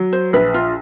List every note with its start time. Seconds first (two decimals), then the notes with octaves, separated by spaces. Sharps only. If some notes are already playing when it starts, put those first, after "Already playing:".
Already playing: F#3
0.13 C5
0.33 A#1 B4
0.54 F4